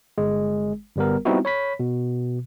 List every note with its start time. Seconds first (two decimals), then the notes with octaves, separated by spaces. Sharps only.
0.18 G1 G#3
0.96 G1 G3 B3 A#4
1.25 G3 B3 C4 D#4 E4 F#4
1.45 C#5 B5 B6
1.80 B2